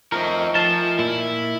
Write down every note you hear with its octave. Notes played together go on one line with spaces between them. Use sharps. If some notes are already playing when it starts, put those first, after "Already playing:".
D#3 F3 A3 C4 A#4 C#5
F3 A#4 E5 G#5 A5
A#2 E4